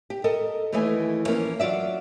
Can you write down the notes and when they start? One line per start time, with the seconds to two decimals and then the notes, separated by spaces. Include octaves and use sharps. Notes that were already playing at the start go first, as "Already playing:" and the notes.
0.10 G4
0.24 A4 A#4 D#5
0.72 D#2 E3 A3 E4 D#5 G#5
1.27 E3 F3 A#3 C#4
1.60 F#3 F4 F#4 D5 E5